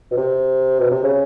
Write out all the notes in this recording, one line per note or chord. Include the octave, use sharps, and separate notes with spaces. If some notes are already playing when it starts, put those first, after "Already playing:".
B2
C3
B2
C3
C#3